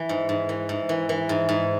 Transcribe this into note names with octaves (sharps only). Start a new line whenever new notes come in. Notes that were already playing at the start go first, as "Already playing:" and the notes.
Already playing: E3
G#2
G#2
E3
G#2
E3
E3
G#2
G#2